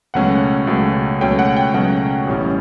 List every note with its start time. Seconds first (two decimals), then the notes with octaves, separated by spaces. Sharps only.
0.14 C#2 B2 F#3 A3 C#4 F#5
0.67 C#2 B2 F#3 A3 C#4
1.21 C#2 B2 F#3 A3 C#4 G5
1.39 F#5
1.57 G5
1.74 C#2 B2 F#3 A3 C#4 F#5
2.27 A1 A2 G3 C#4